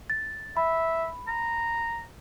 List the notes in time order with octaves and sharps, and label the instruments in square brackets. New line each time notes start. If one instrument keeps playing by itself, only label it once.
[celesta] A6
[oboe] E5 [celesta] B5
[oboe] A#5